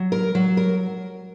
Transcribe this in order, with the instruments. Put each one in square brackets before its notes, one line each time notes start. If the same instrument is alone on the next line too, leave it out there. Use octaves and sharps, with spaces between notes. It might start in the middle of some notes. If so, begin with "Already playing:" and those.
Already playing: [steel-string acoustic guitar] F#3
A#4
F#3
A#4